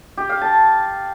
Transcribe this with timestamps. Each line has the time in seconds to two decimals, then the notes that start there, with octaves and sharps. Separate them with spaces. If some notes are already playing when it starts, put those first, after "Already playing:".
0.17 G4
0.29 F5
0.41 A5